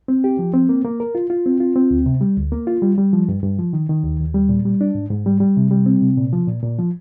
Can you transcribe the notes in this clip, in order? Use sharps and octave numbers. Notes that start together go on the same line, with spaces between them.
C4
G4
F3
C4
A#3
A#3
A#4
F4
F4
C4
F4
C4
D2
C3
G3
D2
A#3
F4
G3
G3
F3
G2
G2
F3
D#3
D#3
D#2
D#2
G3
A#2
G3
D4
G#2
G#2
G3
G3
C3
G3
C4
C3
A#2
F3
A#2
A#2
F3